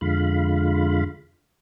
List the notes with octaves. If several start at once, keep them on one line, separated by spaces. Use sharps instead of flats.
F2 D3 G#3 F4 F5 B5